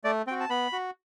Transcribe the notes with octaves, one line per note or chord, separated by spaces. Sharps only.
A3 D5
C4 F#4 G5
A5
B3 B5
F#4